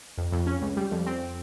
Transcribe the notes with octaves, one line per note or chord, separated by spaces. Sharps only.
F2
F2
C#4
C#2
G3
F2
C4